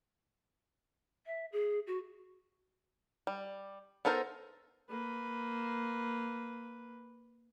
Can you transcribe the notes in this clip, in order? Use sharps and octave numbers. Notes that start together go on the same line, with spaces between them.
E5
G#4
F#4
G3
B3 D#4 A4 A#4 C5
A#3 B4